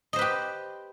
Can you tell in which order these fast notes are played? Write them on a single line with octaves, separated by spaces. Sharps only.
D#5 C5 B4 G4